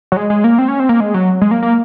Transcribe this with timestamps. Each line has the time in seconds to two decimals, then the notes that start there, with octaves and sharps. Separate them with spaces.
0.12 F#3
0.17 G#3
0.30 G#3
0.44 A#3
0.59 C4
0.68 C#4
0.80 C4
0.89 A#3
1.00 G#3
1.14 F#3
1.42 G#3
1.51 A#3
1.63 A#3